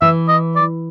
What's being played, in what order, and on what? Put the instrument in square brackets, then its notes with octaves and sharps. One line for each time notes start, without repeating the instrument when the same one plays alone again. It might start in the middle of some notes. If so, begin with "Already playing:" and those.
[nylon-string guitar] E3 [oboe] E5
[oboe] D#5
D5